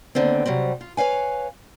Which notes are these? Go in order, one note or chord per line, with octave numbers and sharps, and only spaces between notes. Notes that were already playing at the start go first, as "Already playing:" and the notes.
D#2 D3 B3 C4
C3 F#3 G3 C4
F4
B4 C#5 F5 G#5